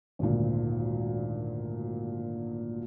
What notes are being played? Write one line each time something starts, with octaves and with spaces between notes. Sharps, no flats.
G#1 D2 A#2